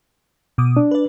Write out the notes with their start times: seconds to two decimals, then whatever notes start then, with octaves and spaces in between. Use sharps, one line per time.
0.58 B2 D6 D#6
0.77 D4
0.91 B4 D5